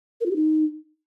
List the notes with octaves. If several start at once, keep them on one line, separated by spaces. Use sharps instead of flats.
A#4
F4
G4
D#4